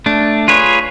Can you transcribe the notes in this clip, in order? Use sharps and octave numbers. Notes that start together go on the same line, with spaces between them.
A3 D4
F4 G#4 B4 C#5